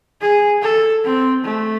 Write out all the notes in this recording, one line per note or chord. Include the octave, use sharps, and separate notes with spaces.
G#4
A4
C4
A3